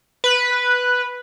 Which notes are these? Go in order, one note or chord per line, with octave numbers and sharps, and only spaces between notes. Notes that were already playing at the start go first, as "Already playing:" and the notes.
B4